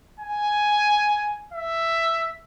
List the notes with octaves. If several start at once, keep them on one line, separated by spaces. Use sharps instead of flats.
G#5
E5